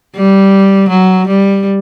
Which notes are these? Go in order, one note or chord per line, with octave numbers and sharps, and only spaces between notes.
G3
F#3
G3